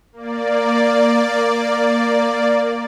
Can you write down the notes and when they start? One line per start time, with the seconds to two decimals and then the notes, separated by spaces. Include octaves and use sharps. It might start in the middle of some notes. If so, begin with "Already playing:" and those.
0.13 A#3 D5